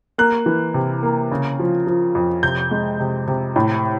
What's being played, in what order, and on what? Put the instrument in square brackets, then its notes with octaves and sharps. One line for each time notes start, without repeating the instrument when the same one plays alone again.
[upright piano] A#3 F#6
E3
C3
A#3
C#3
F3
F3
F2
C3 G6
G#3
C3
C3
A2